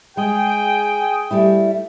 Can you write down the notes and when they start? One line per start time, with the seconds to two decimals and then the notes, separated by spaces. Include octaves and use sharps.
0.17 G#3 G#4 G5
1.31 G3 A3 E4